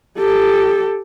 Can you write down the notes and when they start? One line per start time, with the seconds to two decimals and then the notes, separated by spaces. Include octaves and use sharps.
0.18 G4 A4